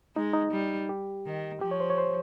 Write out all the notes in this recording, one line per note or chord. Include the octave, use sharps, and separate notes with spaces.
G#3 D#4
D#4
G3
G4
D#3
F3 G4
C#5
C5
C#5
C5